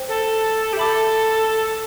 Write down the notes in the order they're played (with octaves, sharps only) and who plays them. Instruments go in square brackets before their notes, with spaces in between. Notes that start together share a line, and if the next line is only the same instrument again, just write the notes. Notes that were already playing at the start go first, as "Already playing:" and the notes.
Already playing: [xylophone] C5 G5
[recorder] A4
G4
[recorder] A4 [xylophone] E5 B5 D6